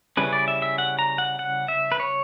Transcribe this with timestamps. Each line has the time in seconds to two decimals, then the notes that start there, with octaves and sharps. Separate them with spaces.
0.17 C#3 G3 C#4 E4 B4
0.33 D5
0.48 E5
0.62 E5
0.78 F#5
0.99 A#5
1.18 F#5
1.39 F#5
1.68 E5
1.92 B4
2.00 C#5